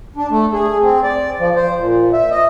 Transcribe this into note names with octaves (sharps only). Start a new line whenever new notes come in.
D4
A3
G#4
C4
D5
F3
C5
A#2
E5
D#5